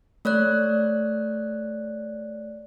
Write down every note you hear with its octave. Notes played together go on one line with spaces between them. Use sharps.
A3 C#5 D5 F#6